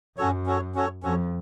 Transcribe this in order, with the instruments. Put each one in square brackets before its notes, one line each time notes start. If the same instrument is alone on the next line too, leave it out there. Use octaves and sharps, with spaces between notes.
[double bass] F#2 [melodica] C#4 F#4 A4 C#5
[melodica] C#4 F#4 A4 C#5
C#4 F#4 A4 C#5
[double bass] F2 [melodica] C#4 F#4 A4 C#5